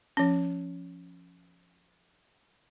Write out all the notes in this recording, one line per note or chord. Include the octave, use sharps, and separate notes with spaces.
F3 C#4